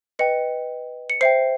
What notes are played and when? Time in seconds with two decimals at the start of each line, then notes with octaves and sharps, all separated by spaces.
0.19 B4 D#5 G5 C#7
1.10 C#7
1.21 C5 E5 G5 C7